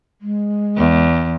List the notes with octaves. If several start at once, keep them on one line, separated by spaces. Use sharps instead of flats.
G#3
E2